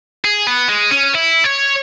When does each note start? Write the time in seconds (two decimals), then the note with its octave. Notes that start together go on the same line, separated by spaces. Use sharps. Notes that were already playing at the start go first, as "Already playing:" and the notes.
0.25 G#4
0.47 B3
0.69 G#3
0.91 C#4
1.14 E4
1.44 C#5